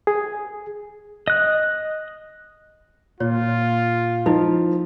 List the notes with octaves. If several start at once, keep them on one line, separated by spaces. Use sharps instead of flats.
G#4
D#5 F#6
A#2 F4 C#5
F3 D#4 E4 D#5